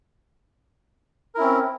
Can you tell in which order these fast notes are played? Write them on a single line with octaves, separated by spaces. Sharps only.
A#4 E4 C#4 C4